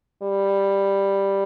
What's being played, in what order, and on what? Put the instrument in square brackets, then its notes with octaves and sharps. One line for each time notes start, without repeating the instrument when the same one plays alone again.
[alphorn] G3